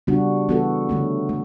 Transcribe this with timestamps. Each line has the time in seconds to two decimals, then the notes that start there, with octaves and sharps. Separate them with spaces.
0.07 C#3 G3 B3 D4 F#4
0.49 E3 B3 F#4 A4
0.89 D3 A3 C#4
1.29 A3